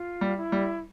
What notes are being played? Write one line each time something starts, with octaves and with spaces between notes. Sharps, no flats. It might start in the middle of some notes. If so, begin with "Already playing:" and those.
Already playing: F4
G3
E4
G3